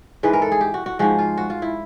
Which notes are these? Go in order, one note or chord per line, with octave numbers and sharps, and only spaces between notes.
G#2 E3 G#3 B4
A#4
A4
G#4
G4
F#4
F#4
G#2 F3 G#3 F#4
F4
F#4
F4
E4